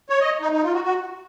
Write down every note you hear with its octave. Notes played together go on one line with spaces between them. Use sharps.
C#5
D#5
D#4
D#4
F4
F#4
F#4